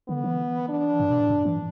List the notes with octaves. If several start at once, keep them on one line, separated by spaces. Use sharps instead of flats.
D3 B3
E3
D4
G2
B2
A2
G2
E3